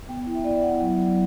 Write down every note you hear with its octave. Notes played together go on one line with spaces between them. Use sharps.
B3 G5
E4
E5
B3 D5
E5
E4 F#5
F#3
F#3